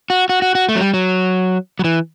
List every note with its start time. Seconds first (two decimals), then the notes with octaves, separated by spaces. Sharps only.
0.10 F#4
0.29 F#4
0.42 F#4
0.55 F#4
0.69 A3
0.75 F#3
0.81 G3
0.94 F#3
1.79 F#3
1.84 E3